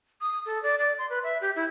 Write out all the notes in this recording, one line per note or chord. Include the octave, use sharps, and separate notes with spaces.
D#6
A4
D5
D5
C6
B4
E5
G4
E4